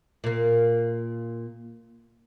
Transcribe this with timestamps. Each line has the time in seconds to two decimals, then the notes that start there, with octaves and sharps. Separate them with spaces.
0.24 A#2 A#3